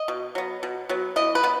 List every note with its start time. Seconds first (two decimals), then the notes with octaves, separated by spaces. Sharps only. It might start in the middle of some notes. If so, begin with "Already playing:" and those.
Already playing: D#5
0.08 B2
0.35 F#3 B3
0.63 B2
0.89 F#3 B3
1.16 E3 D#5
1.35 B4
1.44 B3